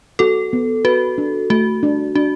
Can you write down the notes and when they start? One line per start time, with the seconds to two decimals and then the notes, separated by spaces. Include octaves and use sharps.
0.19 F#4 A4
0.53 B3
0.85 F#4 B4
1.18 D4
1.50 A3 F#4
1.83 D4
2.15 D4 F#4